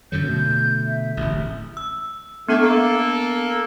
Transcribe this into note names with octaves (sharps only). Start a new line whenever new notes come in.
F#2 D3 F#3 G6
B2 D3 A3
E5
D1 A1
E6
A3 B3 D4 D6
A#3 A4